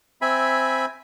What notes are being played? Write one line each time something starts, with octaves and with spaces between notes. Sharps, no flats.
C4 E5 G#5 B5